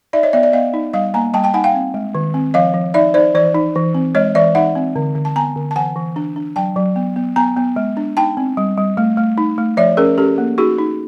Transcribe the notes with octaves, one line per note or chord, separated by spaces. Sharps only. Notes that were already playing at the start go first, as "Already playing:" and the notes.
D#4 D5 E5
C#5 D#5
B3 D5 E5
D5 E5
B3 D#5 F5
D#4
G3 D#5 F5
A#3 G#5 A#5
G3 G5 A5
G5 A5
D#4 F#5 G#5
F5 G5
C4
G#3
D#3
C4
F3 D#5 F5
F3
D#4 D5 E5
D#4 C5 D5
E3 C5 D5
D#4
E3
C4
G#3 C#5 D#5
E3 D5 E5
D#4 E5 F#5
C4
D3
D3
A5
B3 G#5 A#5
D3
A5
E3 F#5 G#5
E3
D4
D4
F#3 G5 A5
F#3
B3
B3
B3 G#5 A#5
B3
G#3
D4
D#4 G5 A5
C4
G3
G3
A3
A3
D#4
A3
F3 D5 E5
C#4 G#4 A#4
C#4 G4 A4
A#3
D#4 F#4 G#4
D#4